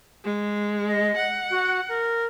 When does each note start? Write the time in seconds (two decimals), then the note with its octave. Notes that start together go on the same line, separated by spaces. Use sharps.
0.24 G#3
0.88 D#5
1.17 F#5
1.51 F#4
1.89 A#4